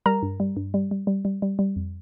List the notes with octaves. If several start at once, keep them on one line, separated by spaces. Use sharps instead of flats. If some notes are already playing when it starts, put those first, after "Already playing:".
G3 A#4 A#5
G2
G3
G2
G3
G3
G3
G3
G3
G3
F2